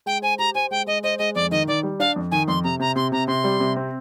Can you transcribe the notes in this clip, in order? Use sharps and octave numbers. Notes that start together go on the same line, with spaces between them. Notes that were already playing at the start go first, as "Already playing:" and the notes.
G#3 G5
C5 G#5
G4 A#5
C5 G#5
G#3 G5
G#3 D#5
C5 D#5
G#3 D#5
F2 D5
D#3 D#5
D#3 D5
G3
D4 F5
F2
D#3 G#5
F2 C6
C3 A#5
C3 A#5
C3 C6
C3 A#5
C3 C6
G3
C3
C4